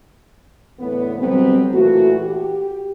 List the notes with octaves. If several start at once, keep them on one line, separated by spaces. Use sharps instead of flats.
E2 A2 D3 B3
B2 D3 F#3 G3 B3 C4
A#2 E3 A3 F#4
G4